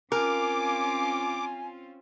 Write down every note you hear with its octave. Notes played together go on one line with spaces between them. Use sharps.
C4 C#4 F4 A#4 G#5 D6